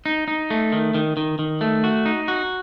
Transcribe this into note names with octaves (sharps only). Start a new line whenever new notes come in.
D#4
D#4
A3
D#3
D#3
D#3
D#3
A3
F#4
D#4
F#4